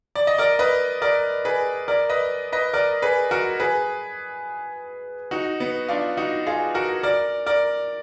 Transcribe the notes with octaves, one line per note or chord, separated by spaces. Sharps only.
D5
D#5
A#4 D5
B4 D#5
A#4 D5
G#4 B4
A#4 D5
B4 D#5
B4 D#5
A#4 D5
G#4 B4
F#4 A#4
G#4 B4
D#4 F#4
B3
D4 F4
D#4 F#4
F4 G#4
F#4 A#4
A#4 D5
A#4 D5